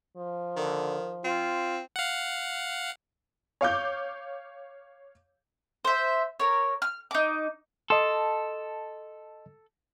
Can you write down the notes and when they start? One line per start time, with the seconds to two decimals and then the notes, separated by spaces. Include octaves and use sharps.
0.17 F3
0.56 D3 D#3
1.24 C4 F4
1.96 F5 F#5
3.61 C#5 F5 D6 G6
5.85 C5 E5
6.40 A#4 C#5
6.82 F6
7.11 D#4 D6
7.90 A4 D#5 A5 C6